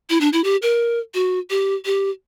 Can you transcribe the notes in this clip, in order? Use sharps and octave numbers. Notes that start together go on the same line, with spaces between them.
E4
D4
E4
G4
A#4
F#4
G4
G4